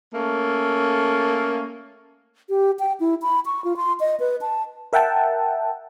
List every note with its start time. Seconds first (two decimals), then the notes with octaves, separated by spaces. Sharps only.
0.13 A3 A#3 C#4 A4
2.49 G4
2.79 G5
3.00 E4
3.22 B5
3.46 C#6
3.64 F4
3.77 C6
4.00 D#5
4.20 B4
4.41 A5
4.93 A#4 E5 F#5 G5 A5